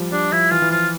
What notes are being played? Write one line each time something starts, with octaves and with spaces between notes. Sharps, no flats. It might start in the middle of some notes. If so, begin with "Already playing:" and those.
Already playing: F3 G3
G3 D4
F3 E4
E3 F4
E3
F3 F4